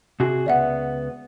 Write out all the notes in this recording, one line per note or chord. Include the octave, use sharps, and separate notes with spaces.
C3 F#4 G#4
C#2 B3 D5 E5 F#5